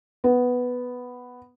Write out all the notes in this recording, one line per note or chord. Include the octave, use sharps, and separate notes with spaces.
B3